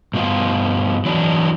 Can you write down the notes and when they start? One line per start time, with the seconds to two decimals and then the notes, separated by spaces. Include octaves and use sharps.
0.14 G2 B2 F3 F4
1.05 E3 F#3 D4